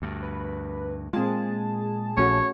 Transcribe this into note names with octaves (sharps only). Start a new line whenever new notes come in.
D2 G2
B4
A#2 G#3 C4 F4 G#4 A5
A#1 A3 C#4 F#4 C#5